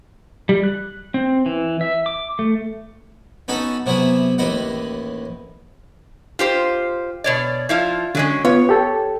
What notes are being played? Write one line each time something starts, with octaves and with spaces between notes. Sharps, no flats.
G3
F#6
C4
E3
E5
D6
A3
B3 C#4 D#4 F#4 A4
C3 F#3 B3 E4 G#4
A1 D#2 E4 D#5 F#5
F4 G4 C5
B2 C#5 D5
F3 E4 F4
D3 F#3 G#3 C#4
B3 F4 B4 C#5
G4 A4 G5